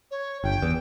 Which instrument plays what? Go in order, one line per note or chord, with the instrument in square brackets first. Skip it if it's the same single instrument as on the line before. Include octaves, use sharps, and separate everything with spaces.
[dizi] C#5
[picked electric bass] G1 [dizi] G5
[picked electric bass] E2